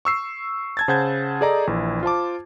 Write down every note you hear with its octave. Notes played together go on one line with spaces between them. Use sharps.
C#6 E6 C7
A5 G#6 A6
C#3 C5 F#5 A5 G6 G#6
G#4 A4 D5 D#5 A#5
A#1 E3
F4 C5 A5 D6